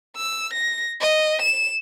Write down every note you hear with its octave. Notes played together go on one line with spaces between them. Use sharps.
E6
A#6
D#5
E7